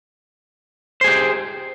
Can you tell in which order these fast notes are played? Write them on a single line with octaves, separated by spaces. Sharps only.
C5 G#4 G4